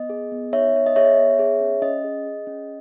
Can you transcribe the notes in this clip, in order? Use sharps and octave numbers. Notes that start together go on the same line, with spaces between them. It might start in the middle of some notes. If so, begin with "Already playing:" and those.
Already playing: B3 D#5
G#4
B3
D#4 C#5 E5
B3 C#5
D#5
G#4 C#5 E5
B3
G#4
C#4
C#4 D#5
G#4
G#4
C#4